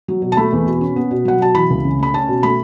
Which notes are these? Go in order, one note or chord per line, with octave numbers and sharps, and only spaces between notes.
F#3
B2
A5
A3 B5
E2
B2
C#4
B3
B2
F#3 F#5
B2 A5
E3 B5
C#2
C#3
A3 B5
C#4 A5
B2
A3 B5